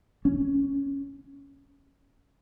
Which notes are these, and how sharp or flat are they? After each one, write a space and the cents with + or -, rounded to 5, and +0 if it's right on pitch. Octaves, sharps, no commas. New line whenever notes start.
C#4 +5